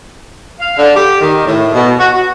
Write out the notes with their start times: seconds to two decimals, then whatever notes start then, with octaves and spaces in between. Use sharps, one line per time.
0.60 F5
0.78 D3
0.96 G4
1.21 D#3
1.46 A2
1.74 B2
1.99 F#4
2.14 F#4